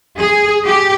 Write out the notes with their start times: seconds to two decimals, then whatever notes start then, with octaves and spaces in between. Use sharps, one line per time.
0.19 G#4
0.67 G4